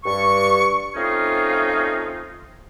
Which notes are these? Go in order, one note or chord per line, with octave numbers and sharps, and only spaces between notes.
G2 C#6
A3 C4 C#4 D#4 F4